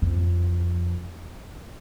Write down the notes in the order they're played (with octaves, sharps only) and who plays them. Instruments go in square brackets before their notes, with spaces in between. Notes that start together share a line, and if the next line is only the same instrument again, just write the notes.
[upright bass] F2